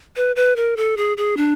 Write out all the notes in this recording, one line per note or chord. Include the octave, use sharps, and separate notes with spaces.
B4
B4
A#4
A4
G#4
G#4
D4